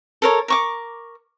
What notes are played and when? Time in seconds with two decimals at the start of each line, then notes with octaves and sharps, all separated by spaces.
0.22 A4 A#4 C#5
0.48 A#4 C#6 D6